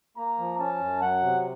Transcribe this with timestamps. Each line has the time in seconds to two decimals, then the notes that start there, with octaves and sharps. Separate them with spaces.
0.17 A#3 A#5
0.38 F3
0.59 C#4 A5
0.79 F#2
1.01 F#3 F#5
1.22 C3